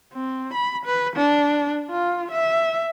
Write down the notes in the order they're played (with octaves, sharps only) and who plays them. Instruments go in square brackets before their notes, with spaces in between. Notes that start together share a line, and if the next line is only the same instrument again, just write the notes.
[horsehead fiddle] C4
B5
B4
D4
F4
E5